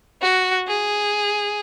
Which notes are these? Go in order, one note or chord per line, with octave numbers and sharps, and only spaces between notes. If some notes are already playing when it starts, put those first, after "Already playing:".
F#4
G#4